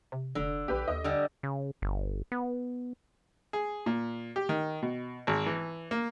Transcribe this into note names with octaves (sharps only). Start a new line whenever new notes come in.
C3
F1 D3
A#1 G4 B4
D#2 D#5
D3 G3
C#3
G1
B3
G#4
A#2
G4
D#3
B2
G#1
E3
A#3